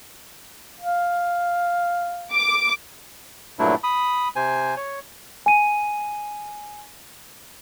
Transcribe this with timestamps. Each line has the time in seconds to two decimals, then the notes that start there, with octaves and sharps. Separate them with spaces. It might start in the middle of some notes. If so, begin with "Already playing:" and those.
0.80 F5
2.34 D6
3.59 G2 A#2 F#3 A3 D4 E4
3.83 B5 D#6
4.36 C3 C5 G#5
4.77 C#5
5.46 G#5 D#7